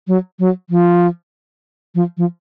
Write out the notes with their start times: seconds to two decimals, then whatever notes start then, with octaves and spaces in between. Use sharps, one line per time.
0.08 F#3
0.39 F#3
0.70 F3
1.95 F3
2.17 F3